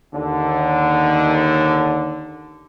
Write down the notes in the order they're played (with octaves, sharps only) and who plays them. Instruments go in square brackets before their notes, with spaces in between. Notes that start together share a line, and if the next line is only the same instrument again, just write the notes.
[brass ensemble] D#2 D3